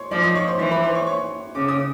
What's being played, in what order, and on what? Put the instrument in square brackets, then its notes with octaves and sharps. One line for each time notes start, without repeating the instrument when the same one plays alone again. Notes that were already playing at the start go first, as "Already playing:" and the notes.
Already playing: [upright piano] C#5 C6 C#6
[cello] F3 [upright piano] D5 D6
[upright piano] D#5 D#6
C#5 C#6
C5 C6
[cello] E3 [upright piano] C5 C6
[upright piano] B4 B5
C5 C6
C#5 C#6
C#5 C#6
[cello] C#3 [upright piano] D6
[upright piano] D#6